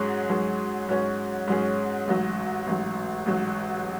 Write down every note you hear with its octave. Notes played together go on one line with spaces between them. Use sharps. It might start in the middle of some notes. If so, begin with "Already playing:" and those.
Already playing: G#2 F#3 C#4 G#4
G#2 F#3 C#4 G#4
G#2 F#3 C#4 G#4
G#2 F#3 C#4 G#4
A1 G#2 F#3
A1 G#2 F#3
A1 G#2 F#3